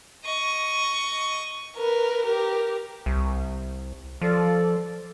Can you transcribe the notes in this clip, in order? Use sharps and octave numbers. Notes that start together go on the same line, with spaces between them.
D#5 C#6
A#4 B4
G4 A#4
C2
F3 A4 D5